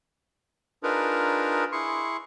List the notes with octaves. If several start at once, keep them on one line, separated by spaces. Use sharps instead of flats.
D4 D#4 F4 G#4 A#4 B4
E4 G#4 C6 C#6